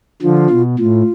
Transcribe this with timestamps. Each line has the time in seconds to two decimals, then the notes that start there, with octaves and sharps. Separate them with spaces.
0.22 D3 F3 F4
0.50 B2
0.78 A2 F4